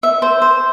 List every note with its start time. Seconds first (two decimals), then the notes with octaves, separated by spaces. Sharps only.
0.03 E5
0.22 C5
0.42 C5